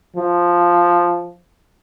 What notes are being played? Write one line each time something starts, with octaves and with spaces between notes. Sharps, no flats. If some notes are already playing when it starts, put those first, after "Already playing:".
F3